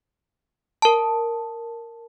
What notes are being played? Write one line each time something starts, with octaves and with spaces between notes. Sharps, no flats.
A#4 A5